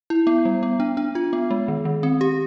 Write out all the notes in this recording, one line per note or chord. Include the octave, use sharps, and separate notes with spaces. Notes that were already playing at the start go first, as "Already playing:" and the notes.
E4
B3
G3
B3
D4
D4
F4
B3
G#3
D#3
D#3
C4
G4